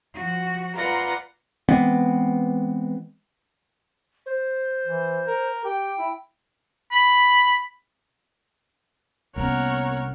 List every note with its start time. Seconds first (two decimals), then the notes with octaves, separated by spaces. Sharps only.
0.13 F3 F#4
0.75 F4 A#4 B4 D5 F#5
1.69 E3 G#3 B3 C4
4.26 C5
4.87 E3
5.27 A#4
5.65 G4 G5
5.99 E4
6.92 B5
9.36 C2 A#3 B3 C#4 A#4 C#5 F#5